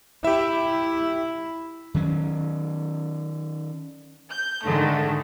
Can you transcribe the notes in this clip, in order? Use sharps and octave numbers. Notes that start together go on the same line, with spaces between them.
E4 G4 E5
D#3 F#3 C#4
G6
G#2 D3 D#3 G#3 A3